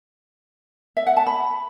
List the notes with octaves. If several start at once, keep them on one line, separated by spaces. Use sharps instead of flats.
E5
F#5
A5
B5